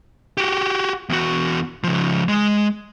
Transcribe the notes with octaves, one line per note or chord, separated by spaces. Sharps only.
F#4 G4
E2 F#4
C#3 F3
G#3